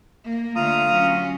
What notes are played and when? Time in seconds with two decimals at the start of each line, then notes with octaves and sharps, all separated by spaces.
0.25 A#3
0.56 D3 A3 F4 A#5 D#6
0.90 F#3 C#4